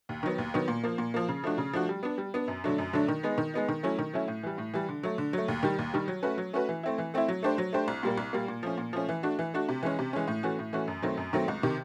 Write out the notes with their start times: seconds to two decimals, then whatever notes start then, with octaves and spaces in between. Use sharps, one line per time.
0.09 D#2
0.23 D#3 F#3 B3
0.38 D#2
0.54 D#3 F#3 B3
0.68 A#2
0.84 F3 A#3
0.98 A#2
1.14 F3 A#3
1.28 C#3
1.44 F3 A3 D4 F#4
1.58 C#3
1.73 F3 A3 D4 F#4
1.89 G3
2.03 B3 D4
2.18 G3
2.34 B3 D4
2.48 F#2
2.64 D3 F#3 A3 D4
2.78 F#2
2.93 D3 F#3 A3 D4
3.08 D#3
3.23 G#3 B3 D#4
3.38 D#3
3.54 G#3 B3 D#4
3.69 D#3
3.83 F#3 A3 C#4 E4
3.99 D#3
4.13 F#3 A3 C#4 E4
4.28 A2
4.43 E3 G3
4.58 A2
4.74 E3 G3
4.89 D3
5.03 F#3 A3
5.18 D3
5.33 F#3 A3
5.48 D#2
5.63 D#3 G3
5.79 D#2
5.94 D#3 G3
6.08 F#3
6.23 A3 C#4 F#4 B4
6.38 F#3
6.53 A3 C#4 F#4 B4
6.69 E3
6.83 A3 C4 E4
6.98 E3
7.14 A3 C4 E4
7.28 F#3
7.43 A3 D4 G4 C5
7.58 F#3
7.73 A3 D4 G4 C5
7.88 C2
8.03 A#2 G3 A#3
8.18 C2
8.33 A#2 G3 A#3
8.48 A#2
8.63 F3 A3 C#4
8.78 A#2
8.93 F3 A3 C#4
9.09 E3
9.23 A3 D4 F#4
9.39 E3
9.54 A3 D4 F#4
9.69 C3
9.83 E3 G#3 C#4
9.99 C3
10.13 E3 G#3 C#4
10.27 A2
10.43 E3 A3 C#4 F#4
10.59 A2
10.73 E3 A3 C#4 F#4
10.88 F#2
11.02 D#3 F#3 A3 C4
11.17 F#2
11.33 D#3 F#3 A3 C4
11.48 C#2
11.63 C3 D#3